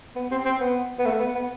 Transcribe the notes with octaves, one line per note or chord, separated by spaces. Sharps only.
B3
C4
C4
B3
B3
A3
B3
B3